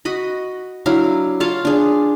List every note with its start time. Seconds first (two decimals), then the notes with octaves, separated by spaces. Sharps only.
0.05 F#4 D#5 B5
0.86 F#3 D4 E4 F5
1.40 F4 C#5 F5 A5
1.65 D4 G#4